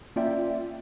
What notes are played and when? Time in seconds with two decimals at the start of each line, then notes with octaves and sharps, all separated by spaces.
0.16 A#3 C#4 F4 D5 E5 G5